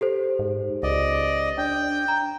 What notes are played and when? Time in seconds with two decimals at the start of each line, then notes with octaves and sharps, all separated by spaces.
0.01 G4 A4 C5
0.39 G#2
0.83 C#2 D5 D#5
1.58 D4 G5
2.08 A#5